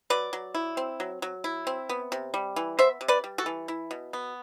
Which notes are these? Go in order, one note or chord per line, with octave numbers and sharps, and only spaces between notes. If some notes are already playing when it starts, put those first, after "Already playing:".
F#3 B4 D5
F#3
E4
C4
F#3
F#3
E4
C4
B3
C3
G3
E3
B3 C5 E5
C3
B4 D5
G3
F#4 A4
E3
E4
B2
B3